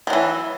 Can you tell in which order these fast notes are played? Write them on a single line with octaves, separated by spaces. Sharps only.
D#3 F#3 E3